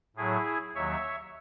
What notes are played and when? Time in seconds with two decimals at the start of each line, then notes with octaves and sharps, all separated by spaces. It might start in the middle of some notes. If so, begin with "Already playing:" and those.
0.17 A2 F#3 E4 G#4
0.75 D#2 D#3 F#3 C#5 E5